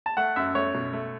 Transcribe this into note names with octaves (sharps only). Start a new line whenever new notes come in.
A5
A3 F#5
F#2 E5
A3 C#5
B2
A3